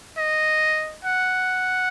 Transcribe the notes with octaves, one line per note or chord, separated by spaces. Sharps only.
D#5
F#5